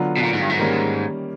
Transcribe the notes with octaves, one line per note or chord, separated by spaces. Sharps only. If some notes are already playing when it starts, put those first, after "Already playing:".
Already playing: D3 F#3 B3 D4 F4
B2
A#2
G#2
G2
G#2
D#3 G3 A#3 C#4